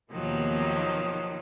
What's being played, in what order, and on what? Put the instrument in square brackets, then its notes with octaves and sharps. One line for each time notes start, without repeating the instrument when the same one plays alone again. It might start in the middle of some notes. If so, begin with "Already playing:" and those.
[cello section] D#2 B2 A#3 [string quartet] D#3 F3 F#3